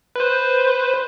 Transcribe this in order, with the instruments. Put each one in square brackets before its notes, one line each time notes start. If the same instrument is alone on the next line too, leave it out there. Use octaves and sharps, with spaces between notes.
[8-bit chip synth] B4 C5